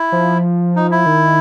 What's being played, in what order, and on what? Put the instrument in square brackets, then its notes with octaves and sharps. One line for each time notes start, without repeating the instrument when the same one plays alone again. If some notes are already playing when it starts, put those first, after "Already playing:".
Already playing: [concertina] E4
[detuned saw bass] F3
[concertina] D#4
E4
[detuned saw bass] D#3